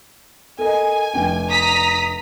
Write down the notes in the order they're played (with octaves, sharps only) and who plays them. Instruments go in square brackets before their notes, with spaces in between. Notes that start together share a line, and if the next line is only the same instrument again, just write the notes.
[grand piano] A4 A#4 D#5 [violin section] G#5
[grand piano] F1 D4 G5
[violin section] A#5 D#6 B6